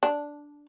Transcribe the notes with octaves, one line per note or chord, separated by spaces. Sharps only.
D4